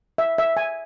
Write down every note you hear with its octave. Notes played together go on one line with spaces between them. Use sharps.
E5
E5
G#5